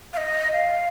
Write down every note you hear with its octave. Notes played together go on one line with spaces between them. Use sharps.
F5
D#5
F5